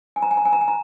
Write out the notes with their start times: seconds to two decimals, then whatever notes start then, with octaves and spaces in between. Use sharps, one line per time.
0.16 G#5
0.22 A#5
0.31 G#5
0.37 A#5
0.45 G#5
0.53 A#5
0.61 G#5
0.68 A#5